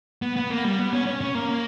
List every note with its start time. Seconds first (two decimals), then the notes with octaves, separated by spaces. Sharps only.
0.22 B3
0.36 B3
0.50 A#3
0.64 G3
0.79 B3
0.93 C#4
1.07 C#4
1.21 C#4
1.35 A#3